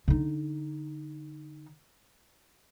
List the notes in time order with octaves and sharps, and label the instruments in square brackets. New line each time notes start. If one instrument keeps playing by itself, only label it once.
[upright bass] D3 D#4